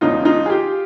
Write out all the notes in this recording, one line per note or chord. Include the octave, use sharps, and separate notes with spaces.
E1 E2 C#3 D#4 F4
D#4 F4
G#4
F4 G4